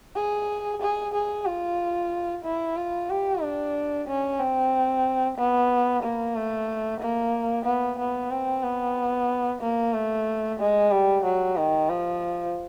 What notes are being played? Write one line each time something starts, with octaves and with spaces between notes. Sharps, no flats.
G#4
G#4
G#4
F4
E4
F4
G4
D4
C#4
C4
B3
A#3
A3
A#3
B3
B3
C4
B3
A#3
A3
G#3
G3
F#3
D#3
F3